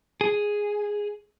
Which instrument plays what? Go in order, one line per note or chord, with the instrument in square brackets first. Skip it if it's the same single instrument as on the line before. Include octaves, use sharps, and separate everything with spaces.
[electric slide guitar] G#4